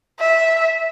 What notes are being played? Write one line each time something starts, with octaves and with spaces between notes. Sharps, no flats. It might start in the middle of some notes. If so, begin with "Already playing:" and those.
E5